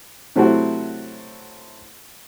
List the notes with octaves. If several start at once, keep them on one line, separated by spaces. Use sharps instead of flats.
C3 F#3 A3 C4 E4 F#4